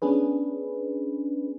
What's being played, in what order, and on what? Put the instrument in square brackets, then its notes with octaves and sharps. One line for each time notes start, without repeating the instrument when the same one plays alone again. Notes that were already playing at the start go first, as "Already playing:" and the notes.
[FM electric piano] B3 C#4 D4 G#4 B4